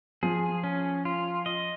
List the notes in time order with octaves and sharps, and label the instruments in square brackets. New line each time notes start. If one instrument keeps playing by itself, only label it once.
[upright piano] F3 [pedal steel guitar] G#4
[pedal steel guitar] C#4
F4
D#5